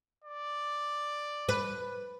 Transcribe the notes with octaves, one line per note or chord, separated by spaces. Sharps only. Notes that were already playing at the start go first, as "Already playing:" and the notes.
D5
B4